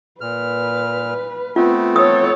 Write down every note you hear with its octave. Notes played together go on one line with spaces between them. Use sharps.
A#2 B4 F6
A3 B3 C4 F4
A4 C#5 D#6